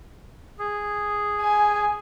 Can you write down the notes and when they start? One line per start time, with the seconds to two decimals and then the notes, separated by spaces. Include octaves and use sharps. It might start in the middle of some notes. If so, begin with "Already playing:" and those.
0.59 G#4
1.41 G#5